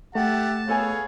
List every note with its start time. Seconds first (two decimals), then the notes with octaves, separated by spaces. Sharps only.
0.15 A3 G4 E5 F#5 A5
0.68 B3 G#4 A4 C#5 F5 G#5